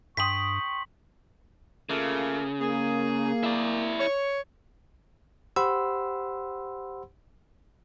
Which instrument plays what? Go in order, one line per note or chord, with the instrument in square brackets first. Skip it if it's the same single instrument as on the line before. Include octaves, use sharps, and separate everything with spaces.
[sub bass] G2 [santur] G5 C6 D#6 [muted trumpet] C#6 [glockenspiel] B6 F#7
[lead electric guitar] C#3 [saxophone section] A3 A#3 F4
[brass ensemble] A#3 [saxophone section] G#4
[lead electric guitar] E4 D5
[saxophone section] C#5
[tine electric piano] G4 C5 F#5 B5 C6 E6